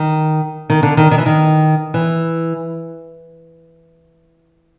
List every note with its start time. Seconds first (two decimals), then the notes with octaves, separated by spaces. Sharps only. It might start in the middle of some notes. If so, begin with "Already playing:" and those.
Already playing: D#3
0.70 D#3
0.83 D3
0.97 D#3
1.11 D#3
1.18 E3
1.26 D#3
1.94 E3